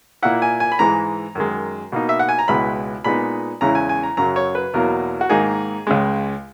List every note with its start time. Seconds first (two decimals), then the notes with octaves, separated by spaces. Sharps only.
0.22 A#2 A#3 E4 F#5
0.42 G#5
0.60 G#5
0.72 B5
0.79 G#2 E3 G#3 A#5
1.35 F#2 D#3 G#3
1.92 B2 A#3 D#4
2.09 E5
2.19 F#5
2.29 G#5
2.39 A#5
2.48 C#2 B2 G#3 B3 E4 B5
3.04 A#2 G#3 B3 D#4 B5
3.61 E2 C#3 G#3 C#4 E4 A#5
3.75 G#5
3.89 G#5
4.03 A#5
4.17 F#2 C#3 F#3 A#5
4.36 C#5
4.55 B4
4.74 E2 B2 F#3 A#3 A#4
5.21 F#4
5.29 G#2 D#3 A#3 D#4 G#4
5.87 C#2 C#3 G#3